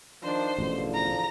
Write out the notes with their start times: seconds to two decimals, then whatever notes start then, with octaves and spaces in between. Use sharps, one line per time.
0.23 D#3 F3 D4 C5
0.58 A1 E2 B2 D3 F3
0.94 A#5